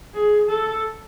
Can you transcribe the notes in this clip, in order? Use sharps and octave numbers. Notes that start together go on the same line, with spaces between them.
G#4
A4